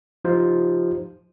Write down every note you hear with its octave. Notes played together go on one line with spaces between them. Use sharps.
F3 D#4 F4 G4 C5